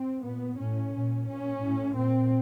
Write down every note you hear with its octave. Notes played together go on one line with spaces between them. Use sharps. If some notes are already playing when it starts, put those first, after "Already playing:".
Already playing: C4
A#2 B3
A2 C#4
A#2
A#2 C#4
A2
A#2 C4